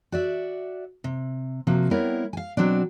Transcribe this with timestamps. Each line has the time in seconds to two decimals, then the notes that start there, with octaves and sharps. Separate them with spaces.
0.12 F#4 D5 E5
1.04 C3
1.67 C3 F3 A#3 F#4
1.91 G3 B3 C4 E4 A#4 C#5
2.33 F5 G#5
2.57 B2 F#3 C4 D4